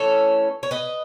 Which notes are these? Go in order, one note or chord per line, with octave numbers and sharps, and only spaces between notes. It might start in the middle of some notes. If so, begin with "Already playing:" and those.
Already playing: E3 A3 C#4 E4 A4 C#5
C#5
B4 D#5